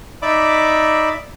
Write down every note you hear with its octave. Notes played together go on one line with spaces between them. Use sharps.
D#4 D5 E5 B5 D6